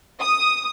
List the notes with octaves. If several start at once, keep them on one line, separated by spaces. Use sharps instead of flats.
D#6